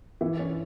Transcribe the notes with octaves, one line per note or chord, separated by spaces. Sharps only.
E3
C#4